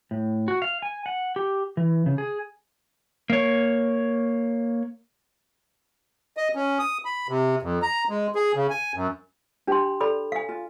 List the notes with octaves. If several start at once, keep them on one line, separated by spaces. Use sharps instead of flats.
A2
F#4
F5
G#5
F#5
G4
E3
C#3
G#4
A#3 C#5
D#5
C#4
D#6
B5
C3
F2
A#5
G#3
G#4
C#3
G#5
F#2
D4 G4 C6
A4 D5 B5
F5 G#5
F4